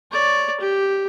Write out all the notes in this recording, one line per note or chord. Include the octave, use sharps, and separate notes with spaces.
C#5 D5
G4